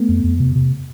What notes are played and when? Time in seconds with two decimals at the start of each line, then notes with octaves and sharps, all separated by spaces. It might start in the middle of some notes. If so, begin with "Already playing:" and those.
Already playing: A3 B3
0.09 F2
0.24 F2
0.40 C3
0.55 C3